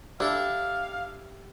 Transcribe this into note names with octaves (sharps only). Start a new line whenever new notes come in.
D4 E4 G4 A4 E5 F5